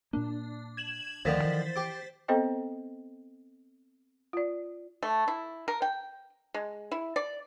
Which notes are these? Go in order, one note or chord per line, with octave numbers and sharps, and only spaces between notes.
A#2 A#3 D4
G#6 E7 F#7
D2 D3 D#3 F3 C5 A6 B6
E3
G4 D6
B3 C4 A4 C5 D#5 G5
F4 D5
A3
E4
A#4
G5
G#3
E4
D5